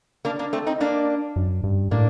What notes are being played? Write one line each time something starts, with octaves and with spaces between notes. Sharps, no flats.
A#3 D4
A#3 D4
A3 C4
C4 D#4
A#3 D4
F#2
G2
A2 A#3 D4